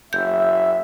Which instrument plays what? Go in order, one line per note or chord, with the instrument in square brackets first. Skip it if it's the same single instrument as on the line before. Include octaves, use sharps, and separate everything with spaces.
[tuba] F#1 [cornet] E5 [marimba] G6